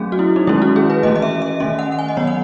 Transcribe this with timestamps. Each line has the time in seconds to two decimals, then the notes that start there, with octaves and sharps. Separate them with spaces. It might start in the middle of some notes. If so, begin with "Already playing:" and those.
Already playing: F#3 A3 C#4 G#4
0.12 F#4
0.19 E4
0.36 D#4
0.47 D#3 G#3 C#4 E4
0.62 F#4
0.76 G#4
0.90 B4
1.03 E3 A3 C#4 D#5
1.16 D#5
1.22 E5
1.42 E5
1.60 D#3 A3 C#4 D#5
1.79 F#5
1.92 F#5
1.99 G#5
2.08 D#5
2.17 D#3 F#3 B3 C#5
2.27 F#5